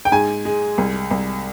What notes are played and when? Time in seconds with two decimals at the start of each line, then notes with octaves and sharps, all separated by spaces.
0.05 G5
0.12 G#2 G#5
0.45 G#3
0.78 C2
1.11 C2